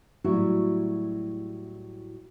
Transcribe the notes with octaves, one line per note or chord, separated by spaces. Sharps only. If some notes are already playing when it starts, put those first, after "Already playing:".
A2 F#3 G3 E4 F#4